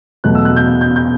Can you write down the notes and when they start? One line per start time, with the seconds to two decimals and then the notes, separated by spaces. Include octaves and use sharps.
0.24 E2 B2 F#3 A3 F#6
0.35 E6
0.45 F#6
0.56 G6
0.81 G6
0.96 G6